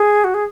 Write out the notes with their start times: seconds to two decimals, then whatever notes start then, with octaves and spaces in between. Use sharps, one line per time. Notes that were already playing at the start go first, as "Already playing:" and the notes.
Already playing: G#4
0.24 F#4
0.34 G#4